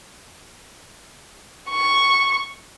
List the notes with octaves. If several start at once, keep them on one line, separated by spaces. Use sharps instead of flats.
C#6